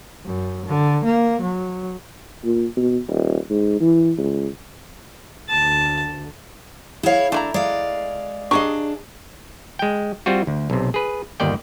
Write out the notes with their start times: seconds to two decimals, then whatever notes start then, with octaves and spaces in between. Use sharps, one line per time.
0.25 F#2
0.66 D3
1.04 A#3
1.41 F#3
2.44 A#2
2.77 B2
3.09 D#1
3.50 G#2
3.81 E3
4.18 C#2
5.49 D2 A5
7.03 E4 G#4 C#5 F5
7.32 A3 D4 E4 A#5
7.54 G#3 D5 F5
8.51 D4 G4 G#4 D#5 A#5 C#6
9.79 G#3 G5
10.26 G3 C4 F4 F#4
10.47 D2
10.70 B1 C3
10.94 G#4 B4
11.40 G1 D#2 D#3 D5 G5